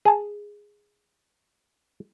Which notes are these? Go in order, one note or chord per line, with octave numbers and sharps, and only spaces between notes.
G#4 A5